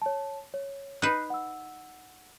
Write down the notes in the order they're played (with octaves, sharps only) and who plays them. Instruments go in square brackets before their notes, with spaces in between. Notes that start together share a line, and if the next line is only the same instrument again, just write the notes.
[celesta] C#5 A5
C#5
[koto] D#4 B4 [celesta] F#6 C7
[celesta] F#5 E6